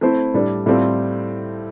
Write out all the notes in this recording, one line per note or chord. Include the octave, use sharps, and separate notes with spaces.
A3 C4 E4 A4 C5
A2 G3 D4
A2 G3 C4 F4 A4